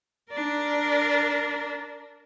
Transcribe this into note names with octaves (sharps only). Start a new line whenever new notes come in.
D4 A#4